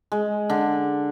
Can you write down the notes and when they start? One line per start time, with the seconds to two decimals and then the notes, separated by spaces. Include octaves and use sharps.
0.12 G#3
0.50 D3